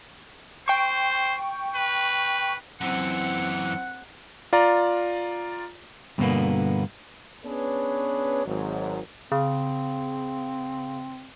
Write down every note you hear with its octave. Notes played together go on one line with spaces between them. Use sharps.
C5 G5 C#6
B4
F#2 E3 C4 F#5 C#7
F4 D5 A#5
G2 B2 D3 G#3 A#3 B3
B3 C#4 D4 G#4 B4 C#5
G#1 G#2 F#3
C#3 C4